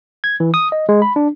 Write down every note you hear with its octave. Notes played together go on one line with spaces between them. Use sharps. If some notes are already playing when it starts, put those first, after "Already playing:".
G#6
E3
D#6
D#5
G#3
B5
D4